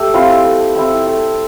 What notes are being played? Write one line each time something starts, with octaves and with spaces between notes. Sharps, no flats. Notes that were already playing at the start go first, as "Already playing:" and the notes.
Already playing: A3 G4
C4 E4 F4
A3
C4 E4
A3